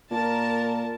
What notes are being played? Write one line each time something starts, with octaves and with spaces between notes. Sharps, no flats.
A#2 A#4 A5